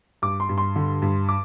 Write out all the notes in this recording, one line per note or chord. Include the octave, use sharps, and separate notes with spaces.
G2 D6
C6
G2
C6
D3
G2
D6